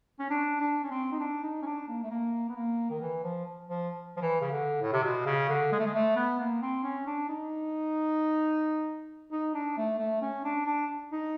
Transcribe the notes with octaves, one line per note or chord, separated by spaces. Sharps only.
C#4
D4
D4
C#4
C4
D#4
D4
D#4
C#4
D4
A#3
A3
A#3
B3
A#3
D#3
E3
F3
F3
F3
E3
C#3
D3
A2
C3
B2
C#3
D3
G#3
A3
G#3
A3
B3
A#3
C4
C#4
D4
D#4
D#4
D4
A3
A3
C#4
D4
D4
D#4